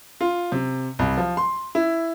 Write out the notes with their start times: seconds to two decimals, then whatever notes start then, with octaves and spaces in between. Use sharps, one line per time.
0.21 F4
0.52 C3
0.99 C2
1.17 F3
1.37 C6
1.75 E4